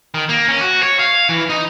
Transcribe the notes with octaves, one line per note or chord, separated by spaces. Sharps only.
D#3
A#3
C#4
F#4
C#5
F5
E3
D#4